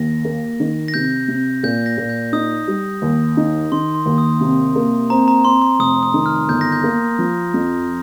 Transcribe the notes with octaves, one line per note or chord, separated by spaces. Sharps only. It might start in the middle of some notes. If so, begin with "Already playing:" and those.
Already playing: D#2 A#6
A#3
D#3
A#6
C3 G6
C3
A#2 G6
A#6
A#2
G6
D#4 D#6
G3
D#2
D#4
D#3 C6
C6
D#2
D#6
C3
A#3
C4 A#5
A#5
C4 C6
C6
F1 D#6
D#6
D#3
F6
G1 G6
A#6
G6
A#3
F3
F2